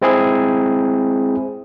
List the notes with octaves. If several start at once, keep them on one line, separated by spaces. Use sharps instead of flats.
G#3 C4 E4 G#4